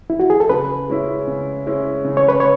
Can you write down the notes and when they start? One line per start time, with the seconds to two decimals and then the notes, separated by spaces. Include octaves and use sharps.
0.10 E4
0.20 F#4
0.30 G#4
0.40 A4
0.50 C#3 B4
0.89 G#3 C#4 E4
1.27 C#3
1.66 G#3 C#4 E4
2.05 C#3
2.17 C#5
2.29 B4
2.40 C#5